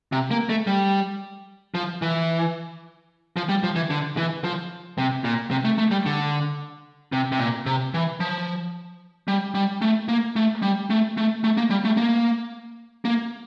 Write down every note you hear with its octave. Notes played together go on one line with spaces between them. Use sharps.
C3
A#3
A3
G3
F3
E3
F3
G3
F3
E3
D3
E3
F3
C3
A#2
C3
A3
A3
G3
D3
C3
C3
A#2
C3
E3
F3
G3
G3
A3
A#3
A3
G3
A3
A3
A3
A#3
G3
A3
A#3
A#3